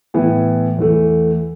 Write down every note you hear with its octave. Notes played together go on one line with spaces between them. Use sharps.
A2 E3 B3 E4
E2 E3 A3